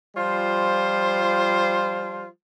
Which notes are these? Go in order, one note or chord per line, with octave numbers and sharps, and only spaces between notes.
F3 G3 F4 C5